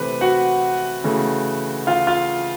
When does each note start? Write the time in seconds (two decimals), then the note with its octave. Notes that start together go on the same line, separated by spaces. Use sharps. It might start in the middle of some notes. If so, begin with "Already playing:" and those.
Already playing: C3 E3 A3 C4 B4 B5
0.21 F#4 F#5
1.04 C#3 E3 A3
1.87 F4 F5
2.07 F4 F5